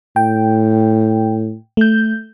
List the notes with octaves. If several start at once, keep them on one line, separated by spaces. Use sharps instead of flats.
A2 G5
A3 G6